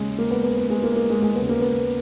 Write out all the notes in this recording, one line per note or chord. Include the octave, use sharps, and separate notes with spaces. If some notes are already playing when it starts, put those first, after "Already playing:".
Already playing: D#2 C#3 G#3
A#3
B3
B3
B3
G#3
A#3
A#3
G#3
G#3
D#2 C#3 B3
A#3
B3